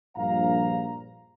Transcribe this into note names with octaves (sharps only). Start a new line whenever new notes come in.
A#1 G2 F5 A#5